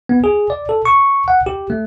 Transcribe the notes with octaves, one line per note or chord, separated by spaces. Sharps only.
B3
G#4
D5
A4
C#6
F#5
G4
A3